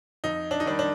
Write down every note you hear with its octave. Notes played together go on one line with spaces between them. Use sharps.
F2 D#4
D4
D#4
D#3 G3 D4
D4